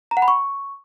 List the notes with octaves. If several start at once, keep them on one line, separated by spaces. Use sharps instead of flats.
A#5
F#5
B5
C#6